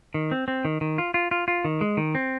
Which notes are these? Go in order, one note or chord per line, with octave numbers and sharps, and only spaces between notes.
D#3
C4
C4
D#3
D#3
F4
F4
F4
F4
D#3
G#3
D#3
C4